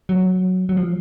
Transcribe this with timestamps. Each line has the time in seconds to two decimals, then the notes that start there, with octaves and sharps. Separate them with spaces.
0.09 F#3
0.69 F#3
0.77 F3